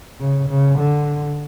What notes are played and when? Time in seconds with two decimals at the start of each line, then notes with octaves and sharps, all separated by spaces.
0.20 C#3
0.49 C#3
0.79 D3